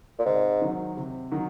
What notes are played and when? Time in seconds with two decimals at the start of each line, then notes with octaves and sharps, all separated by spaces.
0.19 A#2
0.25 G#2 C3
0.62 D#3 F#3
0.97 C3
1.31 D#3 F#3